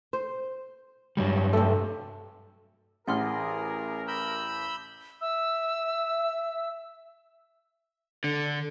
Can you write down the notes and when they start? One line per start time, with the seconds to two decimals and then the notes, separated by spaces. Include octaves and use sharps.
0.13 C5
1.17 G2 F#3 G3
1.53 C3 A3
3.07 A1 G#4 A#4 F#5 C6 F6
4.08 B5 E6 G6
5.21 E5 E6
8.24 D3